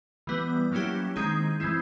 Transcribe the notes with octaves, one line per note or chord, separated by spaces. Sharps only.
E3 G3 B3
F#3 A#3 C#4 E4 G4
D#3 G#3 C4 D#4 G#4
E3 G#3 C4 E4